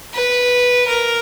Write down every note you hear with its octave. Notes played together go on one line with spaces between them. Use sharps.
B4
A#4